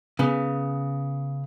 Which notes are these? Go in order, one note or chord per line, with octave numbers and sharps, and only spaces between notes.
C#3 B3